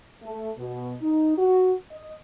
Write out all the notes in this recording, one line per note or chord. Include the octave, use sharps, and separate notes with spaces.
A3
B2
D#4
F#4
D#5